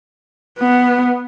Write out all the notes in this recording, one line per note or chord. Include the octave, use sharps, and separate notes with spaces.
B3